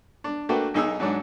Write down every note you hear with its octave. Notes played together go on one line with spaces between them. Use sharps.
D4
A3 A#3 D4 F#4 B4 G5
B1 D#4 G#4 E6
G#2 F#3 D4